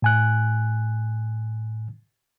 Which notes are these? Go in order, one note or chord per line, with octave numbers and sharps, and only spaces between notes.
A2 G#5 F#6